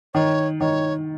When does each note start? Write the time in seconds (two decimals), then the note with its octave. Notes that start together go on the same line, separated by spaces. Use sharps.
0.14 D#3 C#5
0.60 D#3 C#5